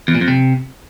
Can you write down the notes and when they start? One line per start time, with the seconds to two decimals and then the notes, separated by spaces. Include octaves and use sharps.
0.08 E2
0.15 A#2
0.21 F2
0.28 C3